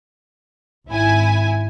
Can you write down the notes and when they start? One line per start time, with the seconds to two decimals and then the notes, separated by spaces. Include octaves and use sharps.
0.89 G#1 E4 G#5